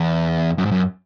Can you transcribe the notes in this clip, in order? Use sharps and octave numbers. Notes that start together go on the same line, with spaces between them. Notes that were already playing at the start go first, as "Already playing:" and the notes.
Already playing: E2
F#2
G#2
F#2